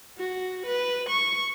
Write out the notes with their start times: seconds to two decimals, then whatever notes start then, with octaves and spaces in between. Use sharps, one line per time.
0.18 F#4
0.67 B4
1.10 C#6